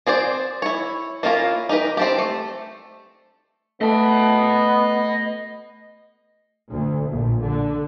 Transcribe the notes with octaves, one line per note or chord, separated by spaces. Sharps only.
C4 G#4 C5 D5
E4 C#5
A#3 C#4 E4 F4 A#4
D#4 G4 A#4 B4
C4 D4 G4
A3
A3 B3 D#5 A5
D2
A#1
D3